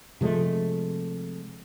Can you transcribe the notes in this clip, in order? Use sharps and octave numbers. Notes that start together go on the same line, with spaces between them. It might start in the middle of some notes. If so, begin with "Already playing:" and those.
C3 F3 G#3 A3